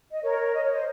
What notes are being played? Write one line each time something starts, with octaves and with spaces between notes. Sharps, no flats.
D#5
A#4 C#5
D#5
C#5
C5 D#5